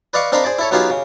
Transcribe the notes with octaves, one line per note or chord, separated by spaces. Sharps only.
B4 D5 D#5 F5 C#6 D6
C4 D4 A#4 D#5 F5 B5
G#4 C5 D5 D6
E4 A4 C#5
F#3 B3 D#4 F4 G4 G#4
C#3